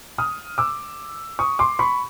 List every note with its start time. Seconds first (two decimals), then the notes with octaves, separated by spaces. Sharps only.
0.18 D#6 F6
0.58 D6 E6
1.39 C#6 D#6
1.59 C6 D6
1.79 B5 C#6